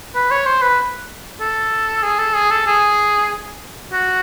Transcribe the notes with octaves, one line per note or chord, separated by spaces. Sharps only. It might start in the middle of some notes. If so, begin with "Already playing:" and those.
B4
C#5
C5
B4
A4
G#4
A4
G#4
A4
G#4
F#4